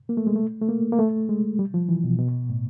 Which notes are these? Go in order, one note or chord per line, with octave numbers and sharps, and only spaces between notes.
A#3
A3
G#3
A3
A3
A#3
A#3
A3
G#3
G3
F3
E3
B2
B2
A2